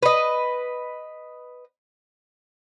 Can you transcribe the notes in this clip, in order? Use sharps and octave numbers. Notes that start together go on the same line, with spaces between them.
B4 D#5